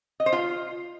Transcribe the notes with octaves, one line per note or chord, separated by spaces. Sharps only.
D#5
C5
F4